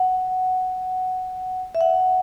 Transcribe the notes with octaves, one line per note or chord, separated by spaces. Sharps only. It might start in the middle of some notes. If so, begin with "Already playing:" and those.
Already playing: F#5
E5
F#5